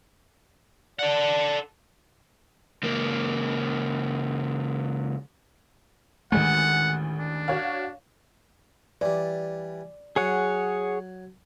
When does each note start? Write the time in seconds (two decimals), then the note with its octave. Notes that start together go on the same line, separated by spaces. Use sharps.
0.99 A4 D5 F#5
2.83 C#2 A#3
6.32 A1 D2 D#3 G#3 A3 F#5
7.18 D4
7.48 F#4 C#5 F5
9.01 E3 G3 D5
10.16 F#3 G#4 C#5 F#5